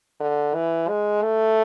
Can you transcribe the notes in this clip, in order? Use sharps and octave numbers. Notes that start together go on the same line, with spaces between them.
D3
E3
G#3
A3